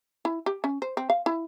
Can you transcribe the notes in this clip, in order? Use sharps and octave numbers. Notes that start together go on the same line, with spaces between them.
E4
G4
C#4
C5
C4
F5
E4